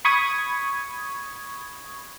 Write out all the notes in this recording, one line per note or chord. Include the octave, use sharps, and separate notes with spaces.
B5 C#6 D#6 G#6